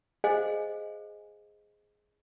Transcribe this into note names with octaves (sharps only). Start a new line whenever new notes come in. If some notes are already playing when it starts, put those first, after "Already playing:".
G#4 C5 D#5 F5 G#5